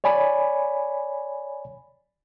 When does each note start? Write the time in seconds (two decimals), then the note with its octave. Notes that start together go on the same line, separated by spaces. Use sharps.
0.04 C#5 D5 G#5 B5